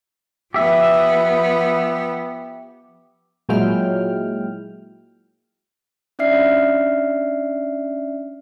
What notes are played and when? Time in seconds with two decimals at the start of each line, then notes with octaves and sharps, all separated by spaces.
0.54 F3 B3 G4 E5
3.49 A#2 F#3 G#3 E4 G5 F6
6.19 C#4 D4 D5 E5 F6 C7